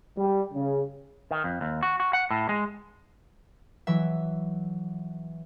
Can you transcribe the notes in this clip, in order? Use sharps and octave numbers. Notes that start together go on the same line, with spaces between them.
G3
C#3
D#3
F2
D#2
F#4
F#4
F#5
A2
G#3
E3 F#3 E5